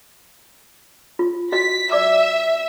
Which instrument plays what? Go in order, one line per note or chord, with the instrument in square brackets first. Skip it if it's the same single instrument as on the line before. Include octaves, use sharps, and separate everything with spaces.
[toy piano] F4
[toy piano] F#4 D#5 [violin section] B6
[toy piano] D5 D6 E6 [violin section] E5